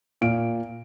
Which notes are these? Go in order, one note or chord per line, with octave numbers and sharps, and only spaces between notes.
A#2 F5 D7